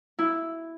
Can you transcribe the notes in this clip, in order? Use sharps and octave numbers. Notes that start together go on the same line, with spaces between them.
E4